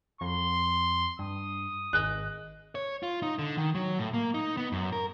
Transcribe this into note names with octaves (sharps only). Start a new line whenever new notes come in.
F2 C6
G2 D#6
G#1 G#4 D#5 F#6
C#5
F4
D#4
D3
D#3
F#3
A2
A#3
D#4
B3
F#2
A#4